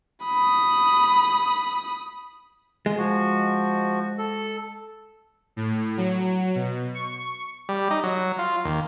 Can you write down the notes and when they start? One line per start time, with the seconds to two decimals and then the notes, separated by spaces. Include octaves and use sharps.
0.24 B5 D#6
2.86 G#3
2.98 F3 F#4
4.18 A4
5.56 A2
5.97 F#3
6.55 B2
6.95 C#6
7.69 G3
7.91 D#4
8.04 F#3
8.38 F4
8.65 D#2